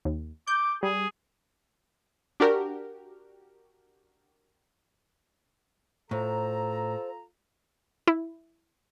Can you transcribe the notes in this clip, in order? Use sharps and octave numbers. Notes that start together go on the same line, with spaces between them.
D#2
D6 G6
G3 G#4
D4 F#4 G4 A#4
A2 F4 A4 C5 A#5
E4